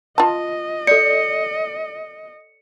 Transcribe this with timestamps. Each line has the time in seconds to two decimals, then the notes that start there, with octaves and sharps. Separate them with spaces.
0.18 F4 D#5 A5
0.87 A4 D5 C#7